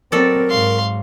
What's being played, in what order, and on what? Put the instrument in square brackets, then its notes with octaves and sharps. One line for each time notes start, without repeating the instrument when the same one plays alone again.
[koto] F#3 A4 D5 [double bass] C4 [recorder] A#4
[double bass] G#2 [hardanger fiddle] F5 C6